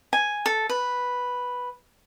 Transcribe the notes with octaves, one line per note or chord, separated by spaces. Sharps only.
G#5
A4
B4